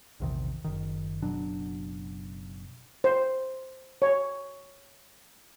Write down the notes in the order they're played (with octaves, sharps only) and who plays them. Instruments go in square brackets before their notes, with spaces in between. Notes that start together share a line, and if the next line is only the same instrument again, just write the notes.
[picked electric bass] A#1 E2 C3 D#3
F#1 D#3
F#1 B2 F#3 D4
[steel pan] C5
C#5